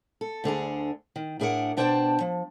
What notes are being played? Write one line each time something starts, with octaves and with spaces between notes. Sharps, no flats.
A4
D2 D3 D4 G#4
D#3
A2 D4 G#4 A#4 B4 F#5
B2 D4 C5 D5 G5 A5
F3